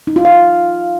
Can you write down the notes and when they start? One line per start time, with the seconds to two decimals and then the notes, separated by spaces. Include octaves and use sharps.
0.07 D#4
0.16 F4
0.25 F5